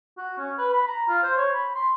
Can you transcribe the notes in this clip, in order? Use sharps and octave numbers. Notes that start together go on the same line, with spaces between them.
F#4
C#4
B4
B5
A#5
F4
C5
C#5
B5
C6